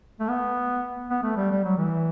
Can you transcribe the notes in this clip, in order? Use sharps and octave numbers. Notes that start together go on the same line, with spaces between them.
A3
B3
B3
A3
G3
G3
F#3
E3